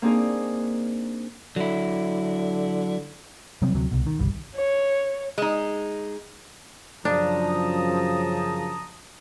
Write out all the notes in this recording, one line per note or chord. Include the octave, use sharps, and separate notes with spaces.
A#3 C4 D4 D#4 G#4 A#4
D3 F#3 E4
C3 F#3 G3 C4
D2 C3 F#3
C2 B2
D#3
G1 C2 G3
C#5
G#3 D#4
F#2 C#3 F3 D4 A5 A#5 D#6